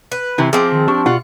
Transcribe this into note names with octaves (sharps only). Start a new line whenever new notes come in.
B4
C3 E3 G#5
F3 C4 G#4 D#5 D6
D#3
D4 G4 A5 C#6
B2 F4 D5 F#5